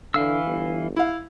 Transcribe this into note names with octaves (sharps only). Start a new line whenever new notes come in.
D3 E3 F5 E6
G1
E4 F5